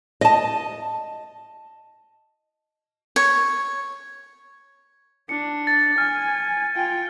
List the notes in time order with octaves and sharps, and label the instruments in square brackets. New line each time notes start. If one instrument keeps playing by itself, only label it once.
[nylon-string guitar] D#5 A5
[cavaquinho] C#5
[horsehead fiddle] D4 [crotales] C#7
[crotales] A6
[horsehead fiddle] G#5 [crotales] F6
[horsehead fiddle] F4 G5